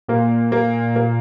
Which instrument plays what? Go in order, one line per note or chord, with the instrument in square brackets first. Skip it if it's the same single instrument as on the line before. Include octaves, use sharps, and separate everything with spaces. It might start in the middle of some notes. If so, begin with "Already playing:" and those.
[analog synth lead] A#2 [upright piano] A#3
[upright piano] A#3
A#3